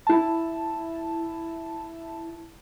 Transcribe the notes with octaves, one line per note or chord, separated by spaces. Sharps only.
E4 A5